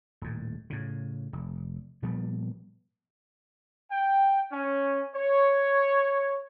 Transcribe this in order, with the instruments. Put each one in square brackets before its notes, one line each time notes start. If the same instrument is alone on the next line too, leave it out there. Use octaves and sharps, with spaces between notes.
[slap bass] D#1 A2
A2 C#3
F1
A#2 F3 G3 B3
[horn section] G5
C#4
C#5